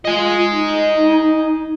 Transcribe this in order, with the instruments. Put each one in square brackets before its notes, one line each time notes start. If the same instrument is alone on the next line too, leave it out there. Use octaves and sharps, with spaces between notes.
[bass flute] F4 [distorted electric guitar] D#5 G#5
[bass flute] D#4